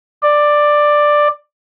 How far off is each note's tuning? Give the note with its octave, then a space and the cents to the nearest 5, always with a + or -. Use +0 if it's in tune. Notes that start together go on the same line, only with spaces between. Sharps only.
D5 +10